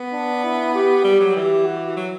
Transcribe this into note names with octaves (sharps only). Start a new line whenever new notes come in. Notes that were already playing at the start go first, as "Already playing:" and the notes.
Already playing: B3
D4
E4
G4
G3 G4
F#3
E3 G4
F#4
F#3